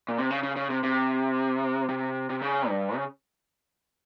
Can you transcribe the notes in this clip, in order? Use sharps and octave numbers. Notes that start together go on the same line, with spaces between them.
A#2
C3
C#3
C#3
C#3
C3
C3
C3
C3
C#3
G2
C#3